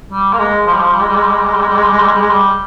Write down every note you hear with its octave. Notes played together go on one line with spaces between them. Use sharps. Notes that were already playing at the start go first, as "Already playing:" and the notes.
G3
A#3
G#3
F3
G3
F3
G3
G#3
G3
G#3
G3
G#3
G3
G#3
G3
G#3
G3
G#3
G3
G#3
G3
G#3
G3
G#3
G3